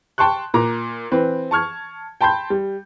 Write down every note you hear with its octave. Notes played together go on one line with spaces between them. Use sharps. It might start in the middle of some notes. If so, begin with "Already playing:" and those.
G5 A5 C6 C#6 F#6
A#2 A#5 D6
E3 C4 B4
A5 C#6 F6 G#6
G5 A5 B5 C6 G6
G3